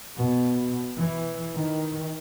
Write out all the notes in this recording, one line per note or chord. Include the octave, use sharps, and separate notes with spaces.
B2
E3
D#3